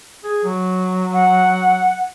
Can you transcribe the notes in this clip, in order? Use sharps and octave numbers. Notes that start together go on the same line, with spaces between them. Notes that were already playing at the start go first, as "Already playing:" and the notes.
G#4
F#3
F#5